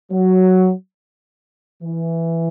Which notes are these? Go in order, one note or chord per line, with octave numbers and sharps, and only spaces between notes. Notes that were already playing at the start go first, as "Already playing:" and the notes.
F#3
E3